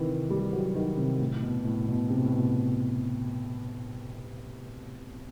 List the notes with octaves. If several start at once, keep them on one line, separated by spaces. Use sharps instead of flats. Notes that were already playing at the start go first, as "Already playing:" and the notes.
Already playing: C3 D#3 E3
G3
F#3
D#3
C3
A2
B2
A2
B2
C3
A2
B2